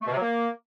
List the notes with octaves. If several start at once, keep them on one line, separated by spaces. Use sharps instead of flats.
A3
B2
C3
F#3
A#3